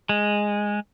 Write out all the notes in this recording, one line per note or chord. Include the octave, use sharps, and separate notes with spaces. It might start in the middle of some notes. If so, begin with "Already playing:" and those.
G#3